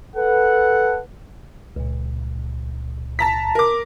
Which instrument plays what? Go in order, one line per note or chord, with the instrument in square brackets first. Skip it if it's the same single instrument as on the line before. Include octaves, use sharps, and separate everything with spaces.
[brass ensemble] A4 B4 F#5
[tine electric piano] C#2 A#2
[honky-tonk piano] A5 A#5 B6
A#4 D6